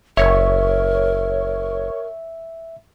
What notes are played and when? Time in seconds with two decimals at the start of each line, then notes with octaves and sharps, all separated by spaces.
0.17 F#1 A#4 C#5 E5